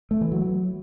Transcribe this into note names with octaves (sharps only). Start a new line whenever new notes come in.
A3
E3
F#3